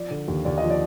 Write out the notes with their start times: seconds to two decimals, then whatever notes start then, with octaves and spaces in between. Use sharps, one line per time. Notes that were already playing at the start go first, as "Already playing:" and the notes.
Already playing: F3 D5
0.11 D3
0.28 D#2
0.45 D#2 D5
0.58 D#5
0.63 F3
0.70 D5